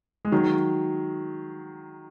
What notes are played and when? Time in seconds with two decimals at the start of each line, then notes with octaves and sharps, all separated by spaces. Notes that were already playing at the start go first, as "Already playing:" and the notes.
0.25 G#3
0.32 D#3 F#3